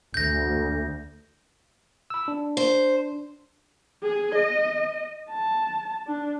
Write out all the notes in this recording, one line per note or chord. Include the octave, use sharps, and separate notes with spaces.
D2 G6 A#6
B5 E6
D4
C5
G#4
D#5
A5
D4